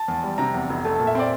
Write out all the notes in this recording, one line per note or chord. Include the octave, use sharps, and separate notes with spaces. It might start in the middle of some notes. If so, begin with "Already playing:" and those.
Already playing: A5
E2
G3
C3 A#5
E2
F1
A3 A5
A#2 A5
E5
C4 D5